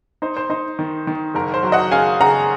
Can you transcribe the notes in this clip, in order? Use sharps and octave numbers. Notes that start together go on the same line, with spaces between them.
D#4 C5
C5
D#4 C5
D#3
D#3
F#1 A#4
C5
F#3
D#5 F#5
C#3 F5 G#5
C#3 F#5 A#5